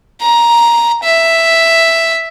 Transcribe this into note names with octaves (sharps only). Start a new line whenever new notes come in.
A#5
E5